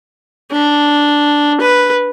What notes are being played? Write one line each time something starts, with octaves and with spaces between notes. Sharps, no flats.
D4
B4